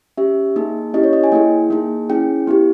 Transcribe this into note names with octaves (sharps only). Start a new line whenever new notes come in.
C#4 G4 E5
A#3 D#4 G#4
C#4 E4 G4 D#5
C#5
D#5
G#5
A#3 E4 G#4 G5
A#3 D#4 G#4
C#4 E4 G#4 G5
B3 E4 G4